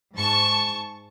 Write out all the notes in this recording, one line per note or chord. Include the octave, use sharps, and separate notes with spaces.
G#2 A5 C#6